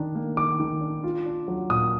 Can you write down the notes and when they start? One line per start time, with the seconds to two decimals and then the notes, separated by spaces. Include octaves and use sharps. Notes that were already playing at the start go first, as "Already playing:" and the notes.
Already playing: D#3 D4
0.15 A#3
0.37 D#3 D6
0.60 D#3
0.81 D4
1.04 F4
1.26 D4
1.48 F#3
1.70 A#2 D#6